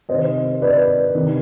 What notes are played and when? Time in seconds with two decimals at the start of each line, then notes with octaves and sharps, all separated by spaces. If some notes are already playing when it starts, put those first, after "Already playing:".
0.09 C3 D#3 C5 D#5
0.62 B4 D5
1.15 C3 D#3